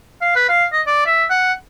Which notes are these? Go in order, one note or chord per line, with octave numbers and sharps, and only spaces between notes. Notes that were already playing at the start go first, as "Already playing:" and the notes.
F5
B4
F5
D#5
D5
E5
F#5